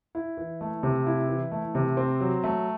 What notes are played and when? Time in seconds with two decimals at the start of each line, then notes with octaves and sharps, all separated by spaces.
0.15 E4
0.37 E3
0.61 A3
0.83 C3
1.06 E4
1.29 E3
1.52 A3
1.75 C3
1.97 C4
2.20 F#3
2.44 A3